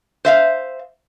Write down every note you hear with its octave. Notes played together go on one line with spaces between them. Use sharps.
C5 E5 F5